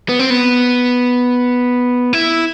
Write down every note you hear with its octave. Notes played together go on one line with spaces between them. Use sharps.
B3
C4
B3
E4